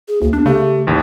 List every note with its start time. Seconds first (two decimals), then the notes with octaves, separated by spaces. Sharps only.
0.08 G#4
0.22 D2 A#3
0.33 B3 D4
0.46 C#3 A3 G4
0.87 A1 D#2